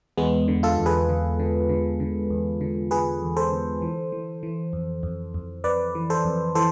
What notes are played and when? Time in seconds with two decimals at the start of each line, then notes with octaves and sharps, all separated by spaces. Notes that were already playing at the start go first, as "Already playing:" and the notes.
0.17 E2 G#3 B3
0.48 D3
0.63 F4 A4
0.78 E2
0.86 G#4 B4
1.09 D3
1.39 D3
1.69 D3
2.00 D3
2.30 E2
2.61 D3
2.91 D3 G#4 B4
3.22 E2
3.37 A4 C5
3.52 D3
3.82 E3
4.12 E3
4.43 E3
4.73 F2
5.03 F2
5.34 F2
5.64 F2 B4 D5
5.95 E3
6.10 A4 C5
6.25 F2
6.55 E3 A4 C5